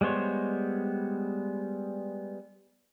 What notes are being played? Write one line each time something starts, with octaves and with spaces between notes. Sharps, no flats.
G3 G#3 B3 C5 C#5